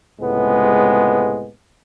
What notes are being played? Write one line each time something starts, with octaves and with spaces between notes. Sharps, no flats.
C#2 A2 C3 G#3 B3